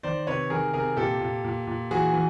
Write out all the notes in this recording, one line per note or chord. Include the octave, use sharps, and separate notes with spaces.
D#3 C5 D5
C3 B4 C#5
D#3 G#4 A#4
C3 G#4 A#4
A#2 G4 A4
A#2
A#2
A#2
E3 F#4 G#4
E3